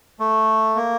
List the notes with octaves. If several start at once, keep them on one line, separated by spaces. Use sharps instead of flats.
A3
A#3